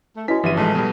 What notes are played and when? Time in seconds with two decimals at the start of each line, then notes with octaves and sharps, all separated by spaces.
0.16 A3
0.28 C#4 E4 F#4 B4 D#5 G#5 B6
0.44 G1 G2 E3 F3 G3 B4 E5 D#7
0.57 A1 G#3 A3 D#4
0.75 B2 G3